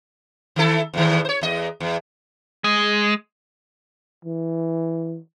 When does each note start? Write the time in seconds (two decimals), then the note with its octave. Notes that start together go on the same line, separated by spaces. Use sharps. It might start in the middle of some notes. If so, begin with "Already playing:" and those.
0.56 D#3 E4 A4
0.94 E2 A2 D#3
1.25 C5 C#5
1.41 E2 D#5
1.80 E2
2.64 G#3
4.25 E3